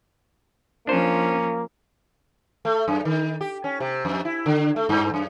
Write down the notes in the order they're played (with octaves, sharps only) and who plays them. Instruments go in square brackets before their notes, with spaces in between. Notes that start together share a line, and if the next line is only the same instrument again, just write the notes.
[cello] F3 C#4 [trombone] A#3 [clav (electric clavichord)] D4 C5
[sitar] A3
F#2
D#3
G4
C#4
C3
F2
E4
D3
A3
G2
F#2